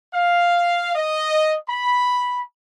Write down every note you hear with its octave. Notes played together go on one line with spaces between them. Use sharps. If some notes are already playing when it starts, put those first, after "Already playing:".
F5
D#5
B5